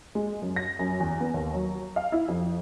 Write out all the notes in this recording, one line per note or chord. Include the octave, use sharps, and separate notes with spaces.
G#3
F#2
A#6
F#2
E2
B3
D#2
F#3
F5
E4
F2